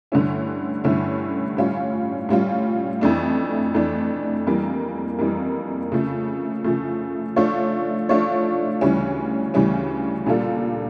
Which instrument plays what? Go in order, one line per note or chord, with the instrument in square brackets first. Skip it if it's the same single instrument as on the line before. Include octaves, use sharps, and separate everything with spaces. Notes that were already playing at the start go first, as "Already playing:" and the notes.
[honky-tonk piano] G2 D3 A3 C#4 E4
G2 D3 A3 C#4 E4
A2 G3 C#4 F4
A2 G3 C#4 F4
F2 E3 A3 D4
F2 E3 A3 D4
F2 E3 G3 A#3
F2 E3 G3 A#3
C#3 F3 A3
C#3 F3 A3
F3 A3 D4 F4 C#5
F3 A3 D4 F4 C#5
D2 C#3 E3 G3 C#4
D2 C#3 E3 G3 C#4
A#2 G3 D4 F4 A4